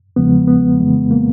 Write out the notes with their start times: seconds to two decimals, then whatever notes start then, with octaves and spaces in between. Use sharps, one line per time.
0.16 E2 C#3 F3 G#3 B3
0.48 B3
0.80 F2 C#3 E3 G#3
1.11 A#3